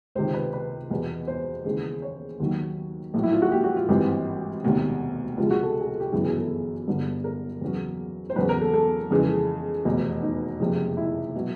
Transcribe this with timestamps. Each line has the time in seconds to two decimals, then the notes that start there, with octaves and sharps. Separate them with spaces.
0.15 C#2 C3 D#3 C5
0.34 B4
0.53 B4
0.91 E2 B2 G3
1.28 C5
1.65 D#2 C#3 E3 G#3
2.02 C#5
2.40 D#2 D#3 F#3
3.14 A#1 A2 F#3
3.23 E4
3.33 F4
3.42 F#4
3.52 G4
3.64 F#4
3.77 F4
3.89 G#1 G2 E3 G3 C4
4.63 E1 D2 C3 D#3 G3
5.37 C#2 C3 F3 G#3 F4
5.51 F#4
5.63 A4
5.81 G#4
5.88 A4
6.00 G4
6.12 G1 F#2 C#3 E3 G#4
6.25 G#4
6.38 A4
6.87 G1 G2 D3 G3
7.24 A#4
7.61 E2 C#3 F#3
8.30 C5
8.36 E2 C#3 F#3 B4
8.49 A#4
8.61 A4
8.74 A4
9.11 F2 C#3 E3 G#3
9.85 F1 E2 B2 G3
10.22 D#4
10.60 F#1 F2 C3 F3 G#3
10.97 E4
11.35 B2 F#3